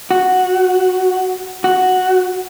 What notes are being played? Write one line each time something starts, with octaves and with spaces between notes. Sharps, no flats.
F#4
F#4